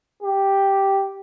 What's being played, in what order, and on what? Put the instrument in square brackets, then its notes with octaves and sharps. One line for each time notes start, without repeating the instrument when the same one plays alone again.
[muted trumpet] G4